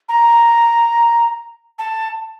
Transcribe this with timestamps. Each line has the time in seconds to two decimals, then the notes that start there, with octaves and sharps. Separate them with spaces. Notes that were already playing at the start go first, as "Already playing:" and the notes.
0.09 A#5
1.79 A5